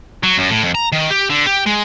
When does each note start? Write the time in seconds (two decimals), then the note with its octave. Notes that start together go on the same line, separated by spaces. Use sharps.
0.23 F#3
0.38 F#2
0.50 A2
0.63 F2
0.75 A#5
0.92 D#3
1.10 G4
1.30 D3
1.46 G4
1.66 G#3